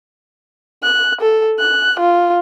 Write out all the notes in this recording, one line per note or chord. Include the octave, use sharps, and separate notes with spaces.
F#6
A4
F#6
F4